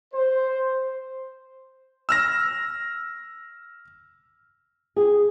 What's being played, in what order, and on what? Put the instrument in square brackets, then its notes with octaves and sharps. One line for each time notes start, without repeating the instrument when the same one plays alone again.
[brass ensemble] C5
[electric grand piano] E6 F6 A#6
[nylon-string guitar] G#4